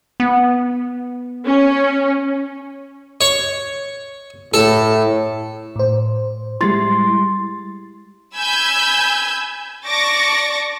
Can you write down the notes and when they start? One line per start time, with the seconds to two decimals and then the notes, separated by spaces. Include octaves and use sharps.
0.20 B3
1.45 C#4
3.21 C#5
4.54 A2 A4
5.76 A2 C5
6.61 G3 G#3 E4 C6 A6
8.38 G#5 B5 E6 G6 G#6
9.87 D5 A5 C#6 D6 A6 A#6